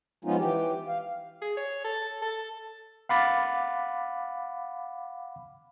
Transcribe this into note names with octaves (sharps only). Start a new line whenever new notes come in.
F3 G#3 B3 C#4 D#4 F4
E3 G4
F5
G#4
C#5
A4
A4
F5 F#5 B5 D6 A6